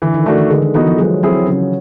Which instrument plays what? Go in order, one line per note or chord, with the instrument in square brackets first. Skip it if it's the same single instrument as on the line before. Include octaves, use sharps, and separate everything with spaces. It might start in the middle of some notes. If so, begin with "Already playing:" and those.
[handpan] D3 [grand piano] E3
[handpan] D#3
[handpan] E3 [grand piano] A3 D4 F#4
[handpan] D#3
[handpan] D3 [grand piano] G#3
[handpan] D#3
[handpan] E3 [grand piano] B3 D#4 F#4
[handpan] F3
[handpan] F#3 [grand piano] G#3
[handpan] F#3 [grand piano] C4 E4 G#4
[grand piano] C#3 [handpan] F#3